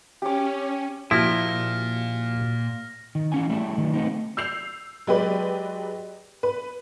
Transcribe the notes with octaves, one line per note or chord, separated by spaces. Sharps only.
C#4 G4 D6
A#2 F3 A#3 E4 F#4 G4 F6 A#6
D#3
E3 C#4 G#5
G3 A3 E4 A4
D#3 E3 F#3
A3 B3 C4 D#4
E6 G6 C7 F7
F#3 G#3 G4 B4 D5
B4